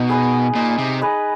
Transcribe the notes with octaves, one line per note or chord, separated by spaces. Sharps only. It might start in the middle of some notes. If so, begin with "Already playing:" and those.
Already playing: B2 D#4
G#4 B4 D#5
A#2 D#4
C3
G#4 B4 D#5